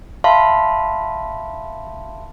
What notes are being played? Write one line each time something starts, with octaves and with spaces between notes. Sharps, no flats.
E5 F5 A5 B5 C6